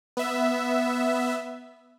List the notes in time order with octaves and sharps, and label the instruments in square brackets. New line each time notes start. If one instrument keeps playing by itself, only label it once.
[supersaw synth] B3 E5